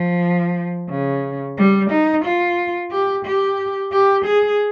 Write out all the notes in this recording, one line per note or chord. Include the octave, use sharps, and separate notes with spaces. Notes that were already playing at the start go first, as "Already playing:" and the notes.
Already playing: F3
C#3
G3
D#4
F4
G4
G4
G4
G#4